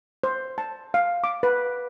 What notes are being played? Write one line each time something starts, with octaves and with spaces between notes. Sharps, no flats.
C5
A5
F5
D6
B4